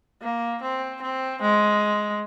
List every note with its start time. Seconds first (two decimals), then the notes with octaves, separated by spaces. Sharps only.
0.22 A#3
0.62 C4
1.02 C4
1.42 G#3